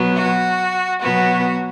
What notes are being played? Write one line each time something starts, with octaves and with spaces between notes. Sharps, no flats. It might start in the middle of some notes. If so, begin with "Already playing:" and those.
Already playing: B2 F#3 B3
F#4
B2 F#3 B3 F#4